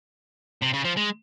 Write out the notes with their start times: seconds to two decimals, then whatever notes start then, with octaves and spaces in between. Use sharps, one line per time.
0.63 C3
0.74 C#3
0.85 F3
0.97 G#3